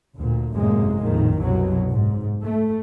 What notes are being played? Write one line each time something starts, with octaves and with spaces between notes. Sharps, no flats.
D2 A#2
G#1 F#2 A2 C3 G#3 A#3
A#1 F2 A2 D#3
C2 F#2 B2 F#3
G#2
A3